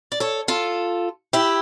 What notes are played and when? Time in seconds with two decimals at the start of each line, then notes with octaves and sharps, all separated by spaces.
0.12 D5
0.20 A4 C#5
0.48 F4 A4
1.33 E4 G4